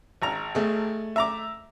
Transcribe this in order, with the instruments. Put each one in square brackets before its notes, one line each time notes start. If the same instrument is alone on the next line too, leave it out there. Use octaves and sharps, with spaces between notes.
[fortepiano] G#1 A#5
[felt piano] A3 G#4
[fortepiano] E5 A#5 D6